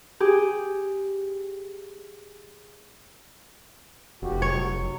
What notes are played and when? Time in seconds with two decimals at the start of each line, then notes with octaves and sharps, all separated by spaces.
0.20 G4 G#4
4.22 F1 F#4 G4
4.42 F#3 C#5